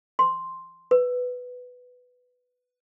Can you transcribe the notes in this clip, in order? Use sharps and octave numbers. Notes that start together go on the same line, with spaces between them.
C6
B4